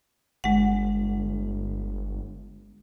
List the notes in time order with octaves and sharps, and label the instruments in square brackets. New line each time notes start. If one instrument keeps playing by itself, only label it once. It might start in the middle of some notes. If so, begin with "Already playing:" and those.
[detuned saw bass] G1 [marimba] G#3 F#5